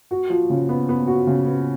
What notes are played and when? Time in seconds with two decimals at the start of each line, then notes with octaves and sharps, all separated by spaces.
0.11 F#4
0.30 F3
0.50 C#3
0.69 B3
0.89 B3
1.07 F#4
1.27 C#3
1.46 B3